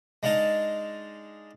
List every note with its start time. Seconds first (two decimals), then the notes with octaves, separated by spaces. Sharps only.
0.23 G#3 D4 D#4 F5 A5